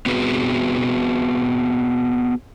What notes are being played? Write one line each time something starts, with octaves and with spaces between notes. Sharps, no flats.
B3 C4 F#4 G#4 B4